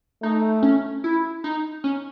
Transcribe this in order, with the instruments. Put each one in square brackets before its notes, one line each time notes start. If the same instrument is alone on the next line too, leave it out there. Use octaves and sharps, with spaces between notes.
[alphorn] A3 [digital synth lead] D#4
[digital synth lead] C#4
E4
D#4
C#4